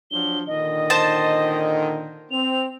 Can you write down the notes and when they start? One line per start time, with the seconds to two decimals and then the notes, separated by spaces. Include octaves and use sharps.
0.11 F3 F#3 D4 G7
0.47 A#2 D3 D#3 D#5
0.90 C5 A5
2.31 C4 F7